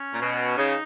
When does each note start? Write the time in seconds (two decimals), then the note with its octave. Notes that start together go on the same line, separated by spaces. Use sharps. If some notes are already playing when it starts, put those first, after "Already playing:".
Already playing: C#4
0.11 A#2
0.21 B2
0.58 C#3 D#4